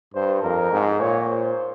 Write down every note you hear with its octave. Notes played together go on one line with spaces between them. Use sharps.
G2 C5
F2 A#4
G#2
A#2 C#5
C5